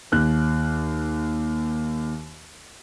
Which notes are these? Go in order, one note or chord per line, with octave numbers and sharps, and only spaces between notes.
D#2 F#6